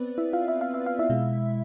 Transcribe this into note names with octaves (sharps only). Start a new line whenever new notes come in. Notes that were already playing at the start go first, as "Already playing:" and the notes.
Already playing: B3 C4 B4 D5
E4 E5
F4 F5
E5
F5
E5
F5
E4 E5
B2 G#3